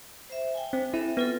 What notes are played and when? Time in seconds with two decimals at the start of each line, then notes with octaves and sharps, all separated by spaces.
0.30 C5 E5
0.54 G5 G#5
0.73 C4
0.94 E4 A4 E5
1.17 B3 C4 F4 A4